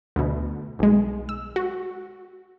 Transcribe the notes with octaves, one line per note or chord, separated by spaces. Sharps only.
D2 B2
B1 G#3
E6
F#4